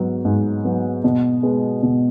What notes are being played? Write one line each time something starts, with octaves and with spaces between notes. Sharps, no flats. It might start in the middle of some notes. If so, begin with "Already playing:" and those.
Already playing: G#2 F#3 B3
G#2
F#3 B3
B2
G#3 B3
B2